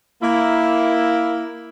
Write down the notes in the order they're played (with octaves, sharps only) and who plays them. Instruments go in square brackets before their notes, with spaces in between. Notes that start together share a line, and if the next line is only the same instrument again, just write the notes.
[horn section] A#3 E4